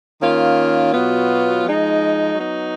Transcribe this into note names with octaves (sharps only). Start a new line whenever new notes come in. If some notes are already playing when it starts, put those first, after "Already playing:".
D#3 A#3 C#4 F4
B2 F#3 B3 F4
F3 G#3 D#4
F#3 B3 D#4